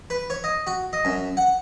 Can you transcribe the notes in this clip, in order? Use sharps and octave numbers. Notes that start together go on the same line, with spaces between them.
B4
C#5
D#5
F#4
D#5
F#2
F#5